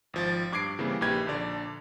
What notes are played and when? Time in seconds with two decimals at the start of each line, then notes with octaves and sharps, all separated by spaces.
0.14 G#1 F3 A6
0.52 G2 D6 G#6 C7 D7
0.79 C#3 E3 G3 A#3 C4
1.01 A#1 A#3 D#4 G4 B4 G#6
1.27 A#1 D3 D5